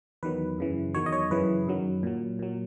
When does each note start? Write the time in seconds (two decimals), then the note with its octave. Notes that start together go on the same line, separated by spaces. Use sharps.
0.23 E2 D#3 F#3 B4
0.58 F#2 C#3 E3
0.94 E2 D#3 F#3 C#5
1.06 D#5
1.12 C#5
1.31 F#2 C#3 E3 B4
1.68 F#2 D#3 F#3
2.03 A#2 F#3
2.39 A#2 F#3